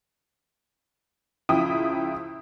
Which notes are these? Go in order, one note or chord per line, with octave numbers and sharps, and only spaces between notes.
C#2 F3 E4 G5 D#6